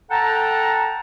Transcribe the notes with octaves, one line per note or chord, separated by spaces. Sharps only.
A4 F#5 G5 A5 A#5